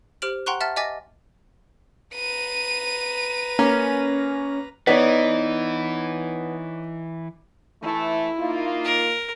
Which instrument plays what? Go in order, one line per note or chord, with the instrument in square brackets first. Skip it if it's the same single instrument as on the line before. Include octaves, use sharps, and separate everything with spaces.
[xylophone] G4 C5 F6 D7 F#7
F#5 G5 A#5 C6 C#6 F#6
E5 F#5 A5 F6 A6
D#5 E5 G#5 D6 A6 A#6
[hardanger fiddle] B4 A#5 [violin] D#7
[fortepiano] A#3 [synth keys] C#4
[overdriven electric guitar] E3 [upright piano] B3 [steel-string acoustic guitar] D#4 [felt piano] C#5 D5 B6
[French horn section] E3 A3 [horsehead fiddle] E4
[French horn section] A#3 D#4 F4
[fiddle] A#4